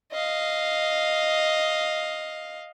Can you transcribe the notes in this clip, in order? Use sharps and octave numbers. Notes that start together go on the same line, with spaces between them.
D#5 F5